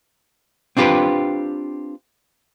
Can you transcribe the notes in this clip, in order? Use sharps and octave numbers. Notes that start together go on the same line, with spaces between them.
C4 D4 F4 G4 B4